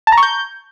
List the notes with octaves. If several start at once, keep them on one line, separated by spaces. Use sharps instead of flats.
A5
A#5
C#6
G6